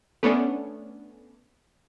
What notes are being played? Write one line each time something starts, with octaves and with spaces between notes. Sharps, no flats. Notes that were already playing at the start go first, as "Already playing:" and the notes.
A3 B3 C#4 D4